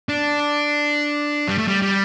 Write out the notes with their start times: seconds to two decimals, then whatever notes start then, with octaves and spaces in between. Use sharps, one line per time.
0.09 D4
1.48 G3
1.58 A3
1.68 G3
1.82 G3